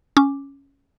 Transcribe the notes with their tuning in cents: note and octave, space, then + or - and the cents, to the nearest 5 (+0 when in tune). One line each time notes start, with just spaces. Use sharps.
C#4 +0 D6 +0